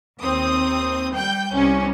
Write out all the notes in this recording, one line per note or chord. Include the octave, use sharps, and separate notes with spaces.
D#2 C4 D#6
G3 G5 G6
C2 C#4